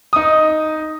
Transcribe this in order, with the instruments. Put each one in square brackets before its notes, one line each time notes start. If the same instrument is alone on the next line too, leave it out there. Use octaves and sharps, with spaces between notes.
[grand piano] D#4 D#6